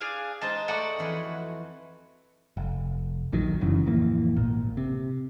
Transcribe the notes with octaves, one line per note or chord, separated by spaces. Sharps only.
D4 G#4 F5
G#3 D#4 C5 A5 C6
A3 F#4 D5 C#6
F2 E3 G#5
F1
A#1 D#2 D#3 F#3
F1 F#2 C#3 E3
D1 F2 E3 A#3
G#1 A#2
C3